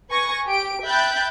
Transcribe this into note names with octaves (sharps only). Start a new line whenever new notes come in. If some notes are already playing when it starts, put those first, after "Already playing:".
B4 G#5 C#6 G#6 A#6
G4 D7
E5 G5 B5 F#6 G6 A6